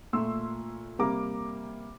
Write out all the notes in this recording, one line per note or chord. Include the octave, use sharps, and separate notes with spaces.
A#2 A3 C6 E6
C3 G3 A#3 A#5 D6